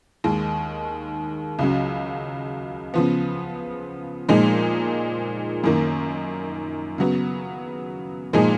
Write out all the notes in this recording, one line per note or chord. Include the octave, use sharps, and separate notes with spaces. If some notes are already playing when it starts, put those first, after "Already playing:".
D#2 D#3 G#3
C#2 C#3 F#3
C#3 F3 B3
A#2 F3 G#3 D#4
F#2 D#3 A#3
C#3 F#3 B3
A#2 F3 G#3 D#4 G#4